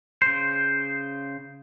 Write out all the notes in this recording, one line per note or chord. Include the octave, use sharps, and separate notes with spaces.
C#3 C5